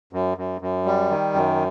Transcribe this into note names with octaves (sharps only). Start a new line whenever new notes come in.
F#2
F#2
F#2
G3
D#3
F#2